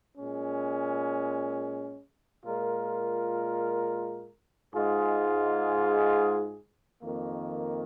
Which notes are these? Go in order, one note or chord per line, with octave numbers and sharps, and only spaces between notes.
A#2 G#3 C#4
A#2 G#3 F4 A#4
G#2 G#3 F4 G#4
F2 D#3 A#3